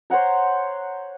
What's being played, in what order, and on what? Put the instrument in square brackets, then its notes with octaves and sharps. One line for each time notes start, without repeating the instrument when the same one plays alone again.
[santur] C5 C#5 F#5 A#5